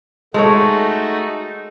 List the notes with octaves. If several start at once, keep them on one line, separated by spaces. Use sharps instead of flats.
G#3 A3 D#4 F#4 A4 C#5